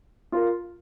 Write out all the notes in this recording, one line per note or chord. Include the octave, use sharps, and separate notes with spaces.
F4 A#4